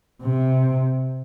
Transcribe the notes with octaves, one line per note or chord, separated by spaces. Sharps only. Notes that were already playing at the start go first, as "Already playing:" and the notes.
C3